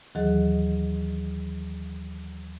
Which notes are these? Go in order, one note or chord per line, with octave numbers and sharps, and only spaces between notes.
D#2 D#3 E3 F#3 G#4 D#5